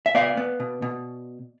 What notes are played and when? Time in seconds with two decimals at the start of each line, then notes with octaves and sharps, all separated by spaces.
0.06 E5
0.15 B3 D5 F5
0.37 B3
0.60 B2
0.82 B2